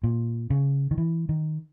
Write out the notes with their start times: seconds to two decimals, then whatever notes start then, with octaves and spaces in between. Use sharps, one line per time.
0.03 A#2
0.50 C#3
0.91 D#3
0.98 E3
1.29 D#3